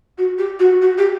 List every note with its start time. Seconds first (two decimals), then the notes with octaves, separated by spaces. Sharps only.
0.18 F#4
0.38 G4
0.59 F#4
0.82 F#4
0.97 G4